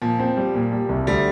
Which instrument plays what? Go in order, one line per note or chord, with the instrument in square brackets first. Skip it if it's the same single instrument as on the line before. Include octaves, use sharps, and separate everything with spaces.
[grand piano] A#2 [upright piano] F3
[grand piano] C4
G3
A#2
G3
C2
[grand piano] D2 [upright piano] G3